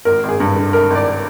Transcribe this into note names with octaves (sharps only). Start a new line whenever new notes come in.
G#1 A#4
G#1
G#4
G2
D3
G#1 A#4
G#1
D5